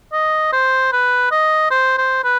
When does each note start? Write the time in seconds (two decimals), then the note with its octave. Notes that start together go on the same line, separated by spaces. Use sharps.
0.13 D#5
0.52 C5
0.92 B4
1.31 D#5
1.71 C5
1.98 C5
2.24 B4